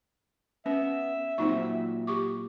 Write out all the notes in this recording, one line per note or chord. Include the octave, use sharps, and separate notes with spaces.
B3 C#4 E5
A#2 F#3 C4 D#4 C#6
G4 C#6 D6